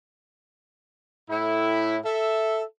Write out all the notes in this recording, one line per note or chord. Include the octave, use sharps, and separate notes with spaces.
A2 E4
A4 E5